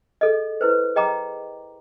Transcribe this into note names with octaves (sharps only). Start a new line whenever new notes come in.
G#4 A4 D#5
E4 B4 C5
G#4 D#5 G5 A#5 D6